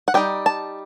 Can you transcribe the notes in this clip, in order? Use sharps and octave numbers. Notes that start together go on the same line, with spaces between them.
F#5
G3 D#4 G5
A5